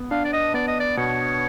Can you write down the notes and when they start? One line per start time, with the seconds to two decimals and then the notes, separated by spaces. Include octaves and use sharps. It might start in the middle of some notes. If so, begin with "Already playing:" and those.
Already playing: B3
0.11 D4 F5
0.25 D5
0.33 D#5
0.54 B3 D5
0.67 D#5
0.80 D5
0.97 B2 C#5